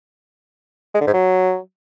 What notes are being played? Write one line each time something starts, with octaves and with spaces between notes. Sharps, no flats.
G#3
D3
G#2
F#3